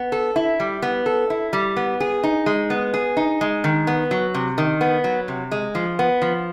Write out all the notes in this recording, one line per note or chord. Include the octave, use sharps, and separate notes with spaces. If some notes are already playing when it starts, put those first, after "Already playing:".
Already playing: B3
A4
E4
G3
B3
A4
E4
G3
B3
G#4
D#4
G#3
B3
G#4
D#4
G#3
D#3
B3
F#3
C3
D#3
B3
F#3
C3
G#3
F3
B3
F3